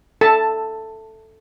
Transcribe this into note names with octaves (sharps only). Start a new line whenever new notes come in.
A4 A5